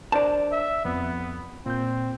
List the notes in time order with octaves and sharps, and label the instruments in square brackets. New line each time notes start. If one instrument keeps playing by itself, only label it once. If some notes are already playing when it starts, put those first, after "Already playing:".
[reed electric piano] D4 A#4 C5 [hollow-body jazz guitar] D5 A5
[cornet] E5
[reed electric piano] F2 [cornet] B3
[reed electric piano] A#2 G6 [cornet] C4